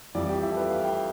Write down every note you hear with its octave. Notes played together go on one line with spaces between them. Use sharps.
F2 E3 G3 D5
G4
E4
A4
B4
F5
G5